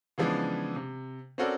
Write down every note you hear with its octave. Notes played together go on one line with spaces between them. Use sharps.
C#3 E3 F3 G#3 B3 D4
C3
C4 C#4 F#4 A4 A#4 D5